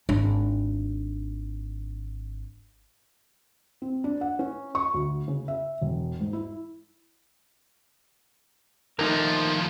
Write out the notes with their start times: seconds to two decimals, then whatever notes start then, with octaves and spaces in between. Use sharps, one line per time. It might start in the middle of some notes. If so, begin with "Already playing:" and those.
0.09 G#1 D4
3.82 C4
4.04 D4
4.21 F#5
4.39 C#4
4.75 C#6
4.94 D2
5.28 C#3
5.48 E5
5.81 E1
6.20 G#2
6.33 E4
8.99 D#2 F3 A3 D#4 A#4